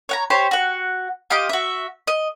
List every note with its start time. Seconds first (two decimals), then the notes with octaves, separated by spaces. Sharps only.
0.09 C#5 F#5 A#5
0.30 G4 C5 C#5 C6
0.51 F#4 F#5
1.30 F4 G4 D#5 D6
1.49 F#4 E5
2.07 D#5